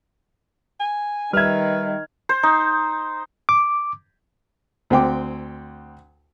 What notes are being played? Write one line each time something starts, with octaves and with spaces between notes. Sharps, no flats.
G#5
D#3 G3 B4 E5 F6 G#6
C5
D#4
D6
D2 C4 G5 D6